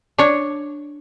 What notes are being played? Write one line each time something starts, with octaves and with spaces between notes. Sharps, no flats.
D4 C#5